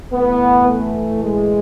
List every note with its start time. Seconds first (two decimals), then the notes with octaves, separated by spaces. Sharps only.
0.12 A2 E3 B3
0.68 A3
1.23 G#3